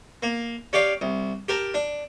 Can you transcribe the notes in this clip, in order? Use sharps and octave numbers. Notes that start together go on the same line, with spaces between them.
A#3
C#4 G4 D5 F5
C2
G4 A#4 A5
D4